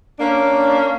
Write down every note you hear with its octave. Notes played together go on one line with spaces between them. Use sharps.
A#3 C#4 D4